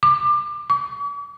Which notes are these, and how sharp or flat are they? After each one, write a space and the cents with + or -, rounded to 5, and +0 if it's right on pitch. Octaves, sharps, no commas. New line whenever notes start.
D6 +25
D6 -45